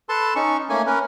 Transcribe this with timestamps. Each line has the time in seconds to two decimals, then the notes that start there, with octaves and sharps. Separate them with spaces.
0.09 A4 B4 A5 C6
0.35 C#4 D#4 C#6
0.70 A3 A#3 C#4 G#5
0.87 C#4 A#4 B4